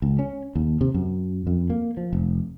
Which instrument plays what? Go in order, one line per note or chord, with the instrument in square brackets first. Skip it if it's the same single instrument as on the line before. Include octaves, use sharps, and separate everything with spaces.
[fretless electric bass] C#2
C#4
D#2
C3
F#2
F2
A#3
F3
F1